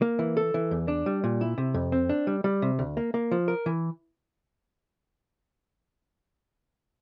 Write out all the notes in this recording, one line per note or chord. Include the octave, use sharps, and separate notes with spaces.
A#3
E3
A4
E3
E2
D4
G3
A#2
E4
C3
F2
C4
D4
G3
G3
C3
D2
A#3
A#3
F3
A#4
E3